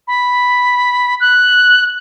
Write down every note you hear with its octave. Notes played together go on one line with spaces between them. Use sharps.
B5
F#6